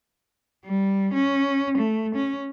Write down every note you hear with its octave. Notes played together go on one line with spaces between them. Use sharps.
G3
C#4
A3
C#4